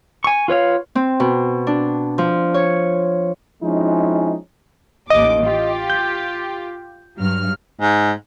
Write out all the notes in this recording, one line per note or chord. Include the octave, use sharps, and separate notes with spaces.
G#5 C#6
F4 B4 C#5 F5
C4
B2
D4
F3
C#5
F3 G#3 C4 C#4 D#4 E4
A1 D#2 D#5 D6
F4 G4
G6
G2 F#3 F6
G#2